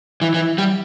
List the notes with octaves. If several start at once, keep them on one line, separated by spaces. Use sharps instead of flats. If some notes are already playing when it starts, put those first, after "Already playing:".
E3
E3
G3